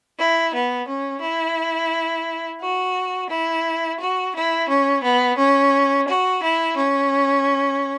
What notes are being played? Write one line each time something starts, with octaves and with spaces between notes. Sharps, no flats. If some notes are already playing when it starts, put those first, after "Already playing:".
E4
B3
C#4
E4
F#4
E4
F#4
E4
C#4
B3
C#4
F#4
E4
C#4